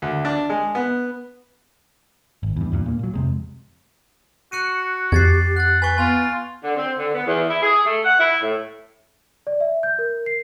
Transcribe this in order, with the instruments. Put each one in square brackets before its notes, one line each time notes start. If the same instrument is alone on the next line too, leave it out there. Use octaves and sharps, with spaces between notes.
[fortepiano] D2
D4
G#3
B3
[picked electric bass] G#1
E2 G2
E2 G2 A#2
A#2 A#3
A#2 F#3
F2 C3 G#3
[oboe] F#4 [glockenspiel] F#6 C#7 D#7
[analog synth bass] F2 [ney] G4 [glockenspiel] G#6 A6 C7
[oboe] F#5 [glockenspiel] F#6 A6
[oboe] B4 [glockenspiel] G#5 C#6
[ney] B3 [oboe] F4 [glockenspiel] G#5
[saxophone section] D3
C4
D3
B3
E2
E4
G#4
A3
F#5
E4
A2
[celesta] D5
E5
G6
A#4
C7